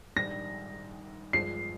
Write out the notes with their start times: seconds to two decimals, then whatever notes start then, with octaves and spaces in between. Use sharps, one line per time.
0.16 A#1 G#2 D#3 G3 D4 A#6
1.33 G1 G2 F3 G#3 C7